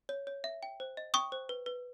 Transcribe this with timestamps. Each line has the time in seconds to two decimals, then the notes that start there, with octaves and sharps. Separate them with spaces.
0.09 C#5
0.27 C#5
0.44 E5
0.63 G5
0.80 C5
0.97 D#5
1.14 G5 C#6 D#6
1.32 C5
1.49 B4
1.66 B4